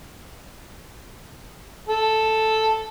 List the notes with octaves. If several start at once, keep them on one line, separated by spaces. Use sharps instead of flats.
A4